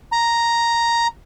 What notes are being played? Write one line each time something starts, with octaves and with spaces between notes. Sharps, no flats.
A#5